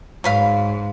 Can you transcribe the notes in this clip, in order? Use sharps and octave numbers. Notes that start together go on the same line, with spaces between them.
G#2 F#3 B4 F5